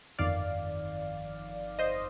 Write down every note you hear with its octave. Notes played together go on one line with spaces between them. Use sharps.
G1 F2 D#3 D5 F5
C5 D#5